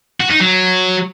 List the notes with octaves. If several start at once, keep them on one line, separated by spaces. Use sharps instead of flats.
F#4
D#4
F#3